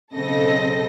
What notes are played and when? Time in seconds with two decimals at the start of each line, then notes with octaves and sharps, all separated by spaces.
0.15 B1 C#3 C4 A4 D#5 A#6